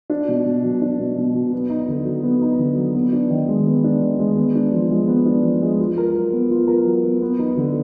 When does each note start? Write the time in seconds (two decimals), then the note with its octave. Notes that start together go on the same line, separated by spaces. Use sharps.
0.10 D4
0.28 B2
0.45 B2
0.64 F#3
0.82 D4
0.99 B2
1.17 B2
1.35 F#3
1.53 B3
1.70 D#4
1.88 D3
2.05 F#3
2.23 B3
2.42 D#4
2.59 D3
2.77 F#3
2.95 B3
3.13 D4
3.30 D#3
3.48 G#3
3.66 B3
3.84 D4
4.02 D#3
4.19 G#3
4.37 B3
4.55 D4
4.73 F3
4.91 G#3
5.08 B3
5.26 D4
5.43 F3
5.62 G#3
5.79 F4
5.98 A#4
6.15 F#3
6.32 B3
6.51 F4
6.67 A#4
6.86 F#3
7.04 B3
7.22 B3
7.39 D#4
7.57 D3